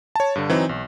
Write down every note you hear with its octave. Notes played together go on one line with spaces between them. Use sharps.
C#5 A5
G2 D3
E3 F#3 C4 D#4
B1